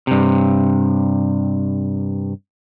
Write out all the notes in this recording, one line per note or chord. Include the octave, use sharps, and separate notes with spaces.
G2 C3